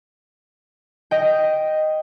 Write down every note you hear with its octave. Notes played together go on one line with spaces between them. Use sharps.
D#5 G5